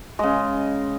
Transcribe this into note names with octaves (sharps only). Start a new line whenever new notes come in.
C#3 G#3 D#5